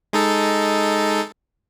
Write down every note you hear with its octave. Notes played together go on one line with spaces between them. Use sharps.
G#3 D#4 A4